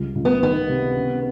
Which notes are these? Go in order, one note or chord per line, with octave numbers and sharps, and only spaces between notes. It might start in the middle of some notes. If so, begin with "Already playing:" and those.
Already playing: C#2 G3
C#2
B3
D#3 B3
C3
C#3